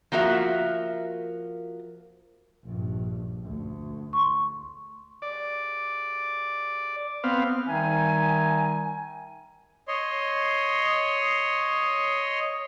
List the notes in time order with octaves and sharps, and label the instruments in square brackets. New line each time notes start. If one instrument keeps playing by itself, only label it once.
[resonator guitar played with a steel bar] F3 A#3 F#4 A#4 E5
[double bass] A#1 G2
D2
[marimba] C6 C#6
[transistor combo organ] D5
B3 C4 F5
[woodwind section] D#3 G3 D#4 E5 G#5
[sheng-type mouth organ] C#5 D#5 C6